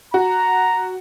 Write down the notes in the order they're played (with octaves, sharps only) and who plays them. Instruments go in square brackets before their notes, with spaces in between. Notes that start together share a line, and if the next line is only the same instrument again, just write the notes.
[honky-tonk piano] F#4 [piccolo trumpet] A#5